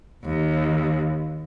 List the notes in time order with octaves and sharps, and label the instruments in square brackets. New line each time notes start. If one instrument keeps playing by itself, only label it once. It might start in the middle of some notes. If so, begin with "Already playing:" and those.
[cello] D#2